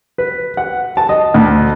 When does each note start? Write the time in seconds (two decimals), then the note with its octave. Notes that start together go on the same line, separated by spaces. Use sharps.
0.18 B4
0.57 F#5
0.97 A5
1.09 D#5
1.34 D2